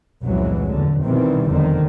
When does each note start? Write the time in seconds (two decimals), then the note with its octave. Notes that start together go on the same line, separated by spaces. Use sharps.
0.23 F1 C#2 A#2 E3 F#3 G#3
0.71 E2 D3
1.03 B2 D#3 E3 G3 C4
1.48 F1 E2 D3 D#3 C4